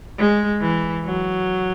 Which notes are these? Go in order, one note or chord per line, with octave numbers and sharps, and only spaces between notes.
G#3
E3
F#3